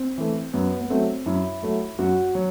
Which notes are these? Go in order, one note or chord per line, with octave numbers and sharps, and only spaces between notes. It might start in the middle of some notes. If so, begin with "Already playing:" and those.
Already playing: C4
E3 A3
F#2 B3
B3
F#3 A3 C4
F#2 E4
F#3 A3
F#2 F#4
F#3